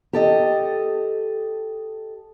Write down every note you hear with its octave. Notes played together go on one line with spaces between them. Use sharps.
G4 A4 D#5